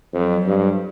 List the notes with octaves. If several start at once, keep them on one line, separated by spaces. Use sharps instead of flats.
F2 F#3
G2